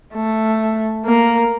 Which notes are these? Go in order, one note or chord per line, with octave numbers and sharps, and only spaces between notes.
A3
A#3